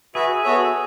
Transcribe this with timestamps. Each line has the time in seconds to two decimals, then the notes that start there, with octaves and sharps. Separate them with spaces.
0.15 F#4 G#4 B4 E5
0.43 B3 F#4 A4 C#5 E5